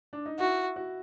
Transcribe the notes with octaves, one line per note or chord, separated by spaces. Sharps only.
D4
D#4
E4 F#4
F#4